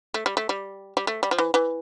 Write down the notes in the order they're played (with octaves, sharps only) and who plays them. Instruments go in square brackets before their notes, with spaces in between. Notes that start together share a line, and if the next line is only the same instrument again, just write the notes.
[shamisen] A3
G3
A3
G3
G3
A3
G3
F3
E3
E3